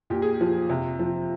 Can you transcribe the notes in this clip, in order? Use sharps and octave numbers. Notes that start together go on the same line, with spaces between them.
A#2 G4
G#4
G4
F3
C3
F3